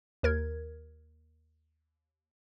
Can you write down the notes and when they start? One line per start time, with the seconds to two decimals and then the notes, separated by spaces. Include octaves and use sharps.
0.23 D#2 A#4 G#6